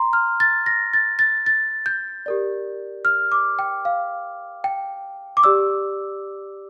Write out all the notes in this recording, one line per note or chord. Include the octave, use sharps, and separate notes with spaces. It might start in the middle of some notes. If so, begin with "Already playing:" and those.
Already playing: A#5 C6
F6
A6
A#6
A6
A6
A6
G6
G4 A#4 D5
F6
D6
G5
F5
G5
D6
G4 D5 E6